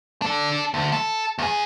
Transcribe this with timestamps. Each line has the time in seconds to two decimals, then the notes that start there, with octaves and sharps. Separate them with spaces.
0.22 D4 A4
0.74 D2
0.93 A4
1.38 E2 G#4